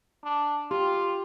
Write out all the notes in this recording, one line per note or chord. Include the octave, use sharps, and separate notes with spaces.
D4
F4 G4